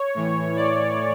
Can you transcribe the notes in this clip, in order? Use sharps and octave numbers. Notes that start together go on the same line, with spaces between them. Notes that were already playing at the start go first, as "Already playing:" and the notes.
Already playing: C#5
A2 E3
D5